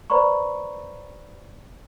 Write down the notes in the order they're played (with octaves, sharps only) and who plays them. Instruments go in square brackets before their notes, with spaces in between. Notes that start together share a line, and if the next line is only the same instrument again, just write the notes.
[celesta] B4 C5 D5 A#5 B5 C#6